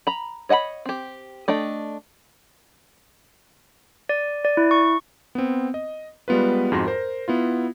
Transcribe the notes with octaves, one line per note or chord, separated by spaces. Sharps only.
A#5 B5
C#5 D#5 F#5 G#5 B5
C4 G4
A3 D4 D#5 G5
D5
D5
E4
C#6
B3 C4
D#5
G3 G#3 B3 F4 B4
F2 G#2 F#4 C6 A#6
A#4 C5
B3 E4 F4